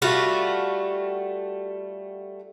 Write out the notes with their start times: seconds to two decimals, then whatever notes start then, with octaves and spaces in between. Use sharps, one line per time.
0.02 G3 A3 F4 F#4